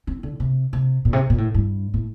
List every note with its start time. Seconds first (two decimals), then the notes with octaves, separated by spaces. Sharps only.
0.07 C4
0.23 D3
0.40 C3
0.73 C3
1.05 A#2
1.13 C3
1.30 A#2
1.38 A2
1.54 G2
1.94 A2